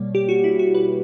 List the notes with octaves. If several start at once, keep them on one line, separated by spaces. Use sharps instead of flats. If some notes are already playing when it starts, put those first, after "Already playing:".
Already playing: B2 G3 A#3 C#5 D5
G4
F#4
E4
F#4
B4